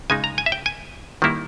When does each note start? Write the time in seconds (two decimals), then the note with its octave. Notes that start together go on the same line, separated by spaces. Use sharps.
0.10 C#3 G#3 D#4 G#5
0.24 A#5
0.38 G#5
0.46 E5
0.52 G5
0.66 G#5
1.22 D#3 G3 A#3 E4